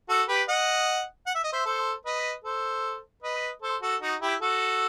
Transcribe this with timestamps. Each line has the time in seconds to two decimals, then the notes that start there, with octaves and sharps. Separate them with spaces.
0.09 F#4 A4
0.28 G4 B4
0.48 D#5 F#5
1.27 F#5
1.35 E5
1.44 D#5
1.52 C5 E5
1.66 A4 C5
2.06 B4 D#5
2.44 A4 C5
3.23 B4 D#5
3.62 A4 C5
3.82 F#4 A4
4.01 D#4 F#4
4.21 E4 G4
4.41 F#4 A4